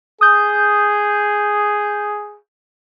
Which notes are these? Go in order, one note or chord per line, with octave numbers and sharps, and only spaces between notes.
G#4 D#6 G6